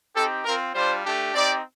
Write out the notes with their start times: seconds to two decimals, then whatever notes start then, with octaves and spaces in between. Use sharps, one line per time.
0.15 C4 D#4 G4 A4
0.45 C4 F4 A#4
0.74 G3 D4 F4 C5
1.04 A3 D4 G4
1.34 C4 D#4 G4 D5